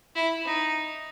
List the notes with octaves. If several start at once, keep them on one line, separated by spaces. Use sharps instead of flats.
E4
D#4